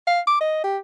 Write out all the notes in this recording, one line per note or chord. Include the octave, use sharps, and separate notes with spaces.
F5
D6
D#5
G4